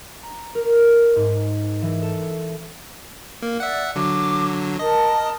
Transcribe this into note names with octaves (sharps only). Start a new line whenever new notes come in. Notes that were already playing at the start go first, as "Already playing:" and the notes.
A#5
A#4
G#2
E3
A4
A#3
D5 E5 F#5
D3 F#3 D6
A#4 D#5 A5